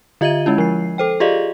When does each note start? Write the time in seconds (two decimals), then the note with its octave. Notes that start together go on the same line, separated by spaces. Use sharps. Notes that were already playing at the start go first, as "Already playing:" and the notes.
0.21 D3 F4 D#5 E5 G#6 D#7
0.46 G#3 C#4 E4
0.58 F3 C7
0.98 A4 C5 G5
1.20 F4 G4 G#4 D5 D#5 F5